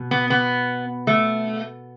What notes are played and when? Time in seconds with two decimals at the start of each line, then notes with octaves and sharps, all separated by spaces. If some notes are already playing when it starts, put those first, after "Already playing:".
Already playing: B2
0.11 B3
0.30 B3
1.07 A3